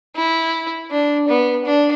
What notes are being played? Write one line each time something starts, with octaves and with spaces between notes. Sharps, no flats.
E4
D4
B3
D4